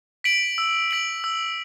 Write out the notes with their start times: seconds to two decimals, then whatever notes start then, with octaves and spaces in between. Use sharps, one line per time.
0.24 B6 D7 F#7
0.58 E6
0.91 B6 D7 F#7
1.24 E6